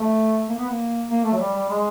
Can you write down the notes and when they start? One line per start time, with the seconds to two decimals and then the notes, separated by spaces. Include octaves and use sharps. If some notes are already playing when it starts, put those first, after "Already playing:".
Already playing: A3
0.49 A#3
0.59 B3
0.69 A#3
1.09 A#3
1.24 A3
1.32 F#3
1.38 G3
1.53 G3
1.69 G#3